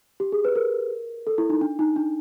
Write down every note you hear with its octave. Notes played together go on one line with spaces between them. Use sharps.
G4
G#4
B4
A#4
A4
E4
D#4
D4
D#4
D4